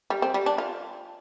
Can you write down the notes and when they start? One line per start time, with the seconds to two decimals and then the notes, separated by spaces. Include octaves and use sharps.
0.10 G3
0.22 C4
0.34 G3
0.46 D4
0.58 F4